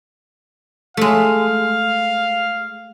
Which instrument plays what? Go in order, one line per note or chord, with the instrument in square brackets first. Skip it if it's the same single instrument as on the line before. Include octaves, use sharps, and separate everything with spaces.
[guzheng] G#3 A3 [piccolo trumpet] F5